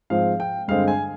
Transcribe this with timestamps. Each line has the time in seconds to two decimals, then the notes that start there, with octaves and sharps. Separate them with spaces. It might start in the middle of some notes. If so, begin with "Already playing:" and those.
0.10 G#2 F3 C4 F5
0.40 G5
0.68 G2 D3 G#3 C4 F5
0.88 G#5